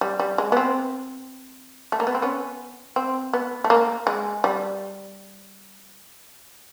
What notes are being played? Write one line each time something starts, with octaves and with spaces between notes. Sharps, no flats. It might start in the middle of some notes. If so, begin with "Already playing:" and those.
G3
G3
G#3
B3
C4
A3
A#3
B3
C4
B3 C#4
C4
B3
A3
A#3
G#3
G3